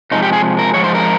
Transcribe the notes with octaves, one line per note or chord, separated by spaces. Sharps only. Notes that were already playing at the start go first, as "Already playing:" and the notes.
C3 F3 G#3 D#4
G4
G#4
A#4
G#2 F3 G#3 C#5
C5
A#4